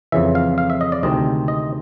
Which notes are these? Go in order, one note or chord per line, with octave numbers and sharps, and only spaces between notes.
F2 C#3 E3 E5
F5
F5
E5
D#5
D5
D2 C3 D#3 G#3 C4 D#5
D#5